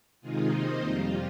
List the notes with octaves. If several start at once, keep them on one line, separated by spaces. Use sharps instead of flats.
C3 D#3 G#3 D#4 F4 G#4
C3 D#3 A#3 D#4 C5 D#5
F2 C3 G3 F4